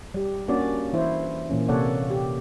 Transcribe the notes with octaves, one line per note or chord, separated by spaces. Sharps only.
G3 G4
A#3 C#4 D4 F#4 D5
E3 E4 C5
A#2 E3 A#3 C#4
C3 A#3 A4 C#5 D5 F#5
G4